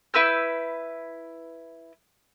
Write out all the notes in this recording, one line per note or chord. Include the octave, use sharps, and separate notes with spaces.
E4 B4 E6 G6